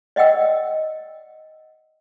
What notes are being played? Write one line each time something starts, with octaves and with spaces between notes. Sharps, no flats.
D5 D#5 F#5 G5 E6